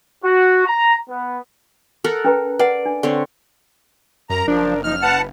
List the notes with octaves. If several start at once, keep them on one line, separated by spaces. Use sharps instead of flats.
F#4
A#5
B3
A4 A#4 F#5
C#4 B4 A#5
B4 D5 F#5
D4
D3 C4 C#5
F#2 A#4 A#5
F#1 F3 D4
F3 D#4 F6
B4 F#5 A5